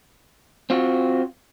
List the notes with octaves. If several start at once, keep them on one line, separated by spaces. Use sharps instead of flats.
C4 F4 F#4